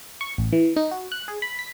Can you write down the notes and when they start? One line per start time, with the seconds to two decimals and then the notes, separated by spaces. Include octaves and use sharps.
0.21 C#6
0.38 A1
0.53 E3
0.76 D#4
0.91 F#4
1.12 F#6
1.28 G#4
1.42 B5
1.59 B6